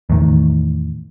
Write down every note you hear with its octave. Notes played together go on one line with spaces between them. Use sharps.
E2 A2 D#3